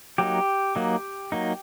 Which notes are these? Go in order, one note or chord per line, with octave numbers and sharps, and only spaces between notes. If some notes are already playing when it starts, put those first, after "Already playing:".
F#3 A#3 D#4 G4
F#3 A#3 D#4
F#3 A#3 D#4